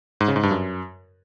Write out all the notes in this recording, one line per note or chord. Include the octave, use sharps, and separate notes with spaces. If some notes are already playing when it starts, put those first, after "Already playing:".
G#2
C#3
G#2
G2
F#2